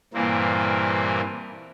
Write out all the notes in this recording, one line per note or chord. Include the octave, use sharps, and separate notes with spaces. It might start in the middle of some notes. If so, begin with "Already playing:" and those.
G2 A#2 E3 A#3 C4